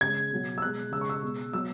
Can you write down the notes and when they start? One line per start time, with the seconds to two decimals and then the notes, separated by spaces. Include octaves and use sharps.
0.01 C#3 G#3 G#6
0.32 B2 F#3
0.58 E6
0.62 B2 G#3 F#6
0.92 C#3 G#3 E6
1.01 C#6
1.09 E6
1.22 B2 G#3
1.53 B2 F#3 E6